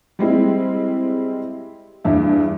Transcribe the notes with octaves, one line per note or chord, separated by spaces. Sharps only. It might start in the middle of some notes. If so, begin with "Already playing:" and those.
G3 G#3 C4 E4
E2 G2 E5